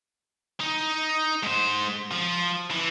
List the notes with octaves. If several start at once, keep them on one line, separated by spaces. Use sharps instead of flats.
D#4
G#2 C5
F3
E3